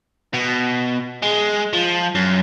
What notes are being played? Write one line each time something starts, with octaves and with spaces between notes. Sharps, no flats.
B2
G#3
F3
F#2